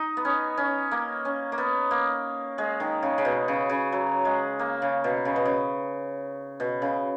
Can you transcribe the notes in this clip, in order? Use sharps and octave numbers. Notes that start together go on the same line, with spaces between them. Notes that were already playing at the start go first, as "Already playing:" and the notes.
Already playing: D#4
B3
C#4
C#4
A#3
C#4
A#3
B3
A#3
G#3
D#3
C#3
C#3
B2
C#3
C#3
F#3
G#3
A#3
C#3
B2
C#3
B2
C#3
B2
C#3